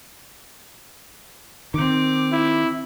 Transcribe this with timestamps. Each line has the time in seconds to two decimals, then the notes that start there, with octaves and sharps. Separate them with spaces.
1.74 D#3 C4 D6
2.32 E4